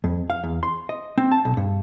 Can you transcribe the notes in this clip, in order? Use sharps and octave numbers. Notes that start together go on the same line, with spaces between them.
F2
F5
E2
C6
D#5
C4
A5
B1
G2